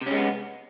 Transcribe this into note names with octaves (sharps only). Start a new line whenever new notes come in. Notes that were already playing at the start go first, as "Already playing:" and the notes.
C3 G#3 B3 C#4